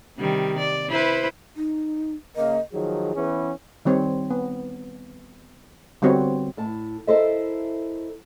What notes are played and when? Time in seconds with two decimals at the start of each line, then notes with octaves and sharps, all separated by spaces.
0.18 C3 D#3 G3
0.59 D5
0.89 E4 B4 C5
1.56 D#4
2.36 C#3 A#3 D#5
2.72 D#3 F3 F#3 G#4
3.15 E3 B3 C#4
3.85 D#3 G3 C4 C#5
4.31 B3
6.02 D3 G3 B3 C4 F#4 C#5
6.57 A2 A5
7.07 E4 A4 A#4 C5 D#5 E5